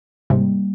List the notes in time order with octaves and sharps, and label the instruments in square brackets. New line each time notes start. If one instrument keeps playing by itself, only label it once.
[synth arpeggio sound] G#2 C3 [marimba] G3 A#3